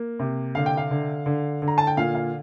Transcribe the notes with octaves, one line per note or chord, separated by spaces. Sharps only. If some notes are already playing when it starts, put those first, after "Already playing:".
Already playing: A#3
C3
D3 F5
G5
F5
D3
D3
D3
A#5
A5
G5
A#2 F5
F5